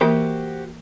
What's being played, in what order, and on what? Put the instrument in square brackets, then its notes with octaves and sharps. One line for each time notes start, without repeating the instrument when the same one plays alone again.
[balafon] E3 A#3 [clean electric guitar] F#4 G4 C5